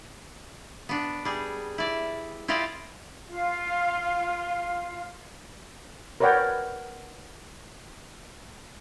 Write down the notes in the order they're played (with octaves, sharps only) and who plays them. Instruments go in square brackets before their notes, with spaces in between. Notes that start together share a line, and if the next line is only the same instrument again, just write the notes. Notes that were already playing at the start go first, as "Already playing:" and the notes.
[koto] B3 D4
G3 G#4
E4 D5
E4 F4 G4 D5 D#5 F5
[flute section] F4 F5
[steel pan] A#4 B4 C#5 D5 F#5 G5